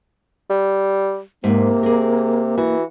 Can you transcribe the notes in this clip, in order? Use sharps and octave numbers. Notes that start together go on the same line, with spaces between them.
G3
G#2 C3 A#3 B3
G#4 A#4
E3 F#4